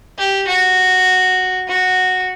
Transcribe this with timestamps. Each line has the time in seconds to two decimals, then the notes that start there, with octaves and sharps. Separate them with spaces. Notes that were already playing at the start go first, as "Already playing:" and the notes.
0.18 G4
0.48 F#4
1.68 F#4